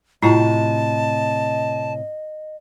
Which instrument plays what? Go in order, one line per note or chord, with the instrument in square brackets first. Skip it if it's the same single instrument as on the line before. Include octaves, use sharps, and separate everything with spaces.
[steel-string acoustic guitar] A2 C3 [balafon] E4 F4 A#5 [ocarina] D#5 [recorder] A5